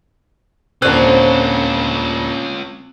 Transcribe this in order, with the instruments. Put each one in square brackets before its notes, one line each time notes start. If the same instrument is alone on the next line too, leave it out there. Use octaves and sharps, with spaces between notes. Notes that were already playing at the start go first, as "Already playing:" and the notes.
[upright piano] D#1 D3 F#6 [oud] C4 [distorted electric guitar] C#4 F4